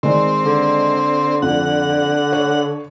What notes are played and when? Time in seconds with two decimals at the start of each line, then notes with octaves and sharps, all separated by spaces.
0.03 D#3 G#3 C4 D5
0.45 D3
1.42 F2 F#5
2.33 C#5